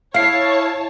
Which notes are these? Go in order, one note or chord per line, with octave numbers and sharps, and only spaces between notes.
E4 C#5 F5 A5 C7